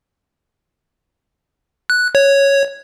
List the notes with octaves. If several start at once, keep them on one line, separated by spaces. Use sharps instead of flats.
F#6
C#5